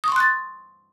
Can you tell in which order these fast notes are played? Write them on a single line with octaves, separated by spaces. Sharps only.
D#6 C#6 C6 F#6 A6